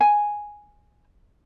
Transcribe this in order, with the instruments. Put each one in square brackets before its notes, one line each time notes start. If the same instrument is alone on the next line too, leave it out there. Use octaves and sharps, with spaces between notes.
[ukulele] G#5